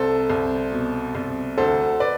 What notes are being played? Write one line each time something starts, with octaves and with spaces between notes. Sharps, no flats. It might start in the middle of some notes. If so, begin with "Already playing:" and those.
Already playing: C2 A4 C5
C2
B2
C2
D2 A4 C5
B4 D5